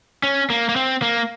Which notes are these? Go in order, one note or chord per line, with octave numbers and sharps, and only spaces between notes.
C#4
A#3
A#3
C4
A#3